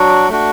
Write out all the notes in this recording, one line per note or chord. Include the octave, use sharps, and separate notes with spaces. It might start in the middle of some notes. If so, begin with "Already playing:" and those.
Already playing: F#3 D4 F#4
A3 D4 F#4